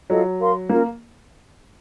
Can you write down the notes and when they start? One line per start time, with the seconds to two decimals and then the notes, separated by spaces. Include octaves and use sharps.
0.10 F#3 F4 A4 D#5
0.39 A#4 F5 C6
0.69 A#3 C#4 F4 A#4